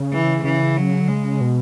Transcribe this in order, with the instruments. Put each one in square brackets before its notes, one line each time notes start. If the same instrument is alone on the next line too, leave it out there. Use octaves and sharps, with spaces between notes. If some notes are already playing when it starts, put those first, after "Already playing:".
Already playing: [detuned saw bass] C#3
[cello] E3
[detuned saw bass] C#3 [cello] E3
[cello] F#3
[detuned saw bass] D3
[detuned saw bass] C#3 [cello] G#3
[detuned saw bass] B2